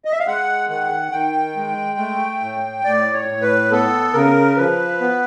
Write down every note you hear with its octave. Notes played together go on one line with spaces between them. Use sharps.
D#5
E5
F5
G#3 F#5
D#3 F#5
D#3 G5
G#3
A3
A2
A2 D5
C#5
A2
B4
B3 A4
C#3 A#4
F3 B4
B3